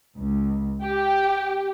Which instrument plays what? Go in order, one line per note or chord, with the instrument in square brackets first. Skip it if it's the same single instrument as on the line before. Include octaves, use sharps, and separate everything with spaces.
[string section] C#2
G4